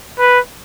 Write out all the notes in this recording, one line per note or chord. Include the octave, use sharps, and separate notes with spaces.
B4